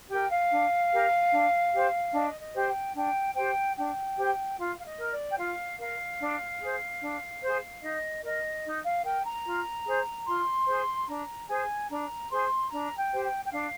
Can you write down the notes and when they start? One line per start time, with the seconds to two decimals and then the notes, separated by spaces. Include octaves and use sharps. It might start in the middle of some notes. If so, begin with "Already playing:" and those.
0.09 G4 A#4 G5
0.30 F5
0.51 D4
0.91 G4 A#4
1.32 D4
1.72 G4 C5
2.13 D4 D#5
2.40 D#5
2.54 G4 C5
2.67 G5
2.95 D4 G5
3.35 G4 C5 G5
3.76 D4 G5
4.16 G4 C5
4.57 F4 F5
4.78 F5
4.84 D#5
4.98 A#4
5.12 D5
5.29 G5
5.38 F4 F5
5.79 A#4 F5
6.20 D4
6.60 G#4 C5
7.01 D4
7.42 G#4 C5
7.82 D#4 D#5
8.23 A#4 D#5
8.64 D#4
8.84 F5
9.04 A#4 G5
9.25 A#5
9.45 F4
9.85 G#4 C5
10.26 F4 C6
10.67 G#4 C5
11.07 D4 A#5
11.48 G#4 C5 G#5
11.89 D4 A#5
12.30 G#4 C5 C6
12.70 D4 A#5
12.97 G5
13.11 G4 C5
13.24 G5
13.44 G5
13.51 D4 F5